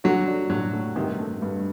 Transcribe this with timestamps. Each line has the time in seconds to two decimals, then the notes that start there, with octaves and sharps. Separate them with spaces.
0.04 D3 F#3 F#4
0.27 D4
0.49 A2 D3 F#3
0.73 A3
0.96 G2 C3 D#3
1.19 A3
1.42 G2